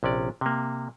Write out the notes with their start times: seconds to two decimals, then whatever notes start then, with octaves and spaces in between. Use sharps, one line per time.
0.03 A#1 C3 C#4 D5
0.41 C3 A#3